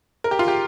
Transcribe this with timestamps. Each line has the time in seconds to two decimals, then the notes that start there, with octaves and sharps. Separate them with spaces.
0.24 A#4
0.31 G4
0.39 F4
0.48 G4